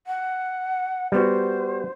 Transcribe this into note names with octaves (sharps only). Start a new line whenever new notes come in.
F#5
G3 B3 F#4 C5